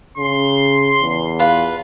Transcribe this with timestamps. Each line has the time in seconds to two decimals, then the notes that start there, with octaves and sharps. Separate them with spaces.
0.18 C#3 C6
1.02 E2
1.39 F4 B4